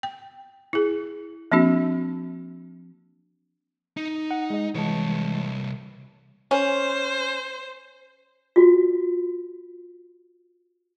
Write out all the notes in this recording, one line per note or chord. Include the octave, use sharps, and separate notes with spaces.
G5
E4 G#4
F3 A#3 C4 D4 F#4
D#4
F#5
G#3 D#5
C2 E3 G#3 C#5 A5
C#4 C5
F4 F#4